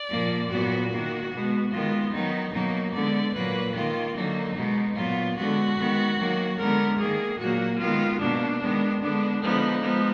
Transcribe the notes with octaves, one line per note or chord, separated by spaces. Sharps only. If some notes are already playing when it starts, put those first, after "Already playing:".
Already playing: D5
A#2 F3 A#3
A#2 F#3 B3 F#4
D#3 A#3
B2 G#3 B3
D#3 G#3 B3 F4
D#3 F#3 B3 D#4
B2 F#3 A#3 D#4
D3 G#3 B3 D5
A#2 F#3 A#3 B4
D#3 A#3 F4
D3 F#3 A#3 D#4
B2 G#3 B3
A#2 F#3 B3 F4
D3 G#3 B3 F#4
D#3 G#3 B3
D#3 F#3 A#3
D3 G#3 B3 A#4
D#3 A#3 G#4
A#2 F#3 A#3 F#4
D#3 G#3 B3 F4
B2 A#3 D4
D#3 G#3 B3
D3 G#3 B3 D4
D3 F3 G#3 B3 D#4
F3 G#3 B3